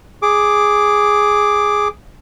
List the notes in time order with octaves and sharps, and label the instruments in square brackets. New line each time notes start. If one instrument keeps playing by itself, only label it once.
[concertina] G#4 D6